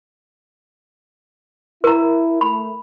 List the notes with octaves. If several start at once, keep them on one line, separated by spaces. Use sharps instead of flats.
E4 A#4 A#5
A3 B5